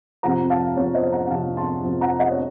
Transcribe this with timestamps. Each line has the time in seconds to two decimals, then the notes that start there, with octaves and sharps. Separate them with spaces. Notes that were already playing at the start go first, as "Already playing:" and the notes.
0.23 F2 C3 F3 F#5 A#5
0.50 F5 A5
0.77 F2 C3 F3 C#5 F5
0.94 C5 D#5
1.12 F#5 A#5
1.26 F#5
1.30 F2 C3 F3 F5 A5
1.57 A5 C6
1.84 F2 C3 F3
2.01 F#5 A#5
2.19 D#5 F#5
2.31 C#5